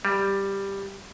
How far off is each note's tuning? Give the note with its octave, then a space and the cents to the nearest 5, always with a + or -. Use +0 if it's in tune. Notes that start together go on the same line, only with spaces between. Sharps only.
G3 +5